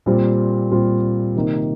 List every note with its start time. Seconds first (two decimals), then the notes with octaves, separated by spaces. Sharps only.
0.06 A#2 G3 C4 F4
0.71 A#2 G3 C4 F4
1.35 C3 D#3 A#3 D#4